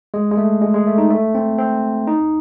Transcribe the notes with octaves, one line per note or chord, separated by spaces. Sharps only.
G#3
G#3
A3
G#3
G#3
A3
D#4
A3
C4
C4
D#4